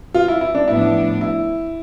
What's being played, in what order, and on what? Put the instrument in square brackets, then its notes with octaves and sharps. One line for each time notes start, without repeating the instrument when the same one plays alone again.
[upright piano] F4
E4
E4
D4
[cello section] A2 F3 B3 D4 [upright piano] E4
[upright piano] E4